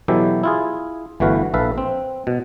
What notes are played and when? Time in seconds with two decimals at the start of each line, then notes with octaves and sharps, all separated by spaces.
0.08 B2 E3 F#3 E4 G4 A4
0.43 E4 F4 G#4
1.20 G1 E3 A3 F#4 B4 F5
1.54 A#1 A4 B4 E5 F5
1.78 C4
2.27 B2